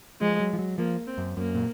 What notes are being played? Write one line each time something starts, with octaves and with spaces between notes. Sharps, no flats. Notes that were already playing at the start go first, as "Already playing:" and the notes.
F3 G#3
F#3
F3
F#3
F3 A#3
C4
F#2
F#2 A#3
A#2